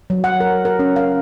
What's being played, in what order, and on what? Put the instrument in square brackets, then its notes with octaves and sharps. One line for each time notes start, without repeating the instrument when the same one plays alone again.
[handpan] F#3
F#5
A#4
A#4
C#4
F5